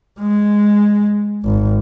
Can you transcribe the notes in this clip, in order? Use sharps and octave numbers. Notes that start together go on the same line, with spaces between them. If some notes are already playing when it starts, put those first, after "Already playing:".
G#3
G#1